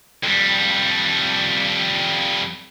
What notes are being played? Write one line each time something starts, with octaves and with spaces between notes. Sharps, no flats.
F2 G3